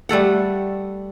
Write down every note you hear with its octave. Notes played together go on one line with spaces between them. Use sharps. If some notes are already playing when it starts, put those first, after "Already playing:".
G3 A3 A4 F#5